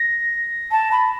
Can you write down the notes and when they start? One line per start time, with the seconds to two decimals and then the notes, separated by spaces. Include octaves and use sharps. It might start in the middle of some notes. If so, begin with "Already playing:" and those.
Already playing: A#6
0.71 A5
0.92 B5